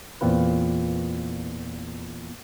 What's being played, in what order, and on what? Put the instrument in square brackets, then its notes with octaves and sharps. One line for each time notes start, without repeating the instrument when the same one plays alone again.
[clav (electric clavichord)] E2 A#2 C4 F4 B4